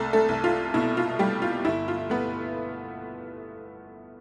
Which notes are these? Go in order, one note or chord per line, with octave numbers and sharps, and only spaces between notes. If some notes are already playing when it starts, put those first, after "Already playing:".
Already playing: C2 A3 A4
A3 A4
C2
F4
B2 E4
F4
G3 A3 G4
F4
G1 E4
F4
A3 B3 B4